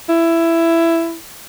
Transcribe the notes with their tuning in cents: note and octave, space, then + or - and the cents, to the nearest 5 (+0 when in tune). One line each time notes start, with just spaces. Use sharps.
E4 +15